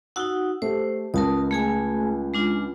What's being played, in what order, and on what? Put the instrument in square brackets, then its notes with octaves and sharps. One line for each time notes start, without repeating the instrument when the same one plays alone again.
[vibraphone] D#4 F#4 F#5 [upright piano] E6 G7
[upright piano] A3 G4 [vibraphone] C5
[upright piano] C#2 [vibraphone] A#4 A5 D#6
[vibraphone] A3 G#4 G#5
G#3 D4 F4